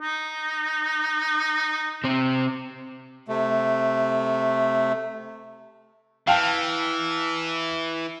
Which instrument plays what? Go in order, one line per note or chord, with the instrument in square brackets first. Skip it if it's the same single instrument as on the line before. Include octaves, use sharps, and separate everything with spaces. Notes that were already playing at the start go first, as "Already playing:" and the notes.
[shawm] D#4
[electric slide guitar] C3 C4
[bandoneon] C3 A3
[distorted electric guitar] E3 [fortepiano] F5 G5 A5